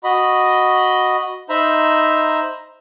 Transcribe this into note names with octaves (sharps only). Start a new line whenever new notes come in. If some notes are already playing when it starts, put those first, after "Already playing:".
F#4 D#5 B5
D#4 C5 E5 A#5 B5